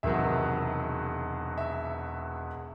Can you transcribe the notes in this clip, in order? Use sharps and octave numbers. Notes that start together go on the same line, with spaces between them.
E1 E2 C3 D#3 F#3 E5
E5